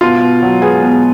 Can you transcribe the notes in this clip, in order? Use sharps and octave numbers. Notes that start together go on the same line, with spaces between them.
B2 F4
B2
F#3
B3 G#4
B2